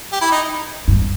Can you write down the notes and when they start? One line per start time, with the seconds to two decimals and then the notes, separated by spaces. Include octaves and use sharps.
0.12 G4
0.21 E4
0.31 D#4
0.88 G2